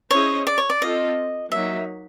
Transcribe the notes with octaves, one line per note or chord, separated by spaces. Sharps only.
C#4 E4 G#4 C5 C#5 D#5
D5
C#5
D5
C4 F4 A4 D#5
F#3 A#3 D#4 E5